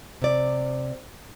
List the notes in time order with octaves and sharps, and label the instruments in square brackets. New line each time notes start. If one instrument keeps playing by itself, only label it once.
[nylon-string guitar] C3 D5